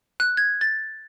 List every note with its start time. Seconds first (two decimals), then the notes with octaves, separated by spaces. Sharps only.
0.20 F#6
0.37 G#6
0.61 A6